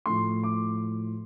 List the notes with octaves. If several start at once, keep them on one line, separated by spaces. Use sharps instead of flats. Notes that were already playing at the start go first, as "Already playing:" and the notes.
A2 F3 A3 C6
D6